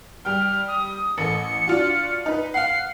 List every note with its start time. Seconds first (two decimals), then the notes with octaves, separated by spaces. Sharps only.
0.25 G3 G5 F6
0.68 D#6
1.18 A1 A4 C#7
1.68 D4 F4 F#4
2.26 D#4 B4
2.54 F5 F#5 C7